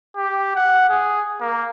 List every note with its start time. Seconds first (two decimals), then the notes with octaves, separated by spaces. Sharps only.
0.17 G4
0.56 F#5
0.90 G#4
1.41 A#3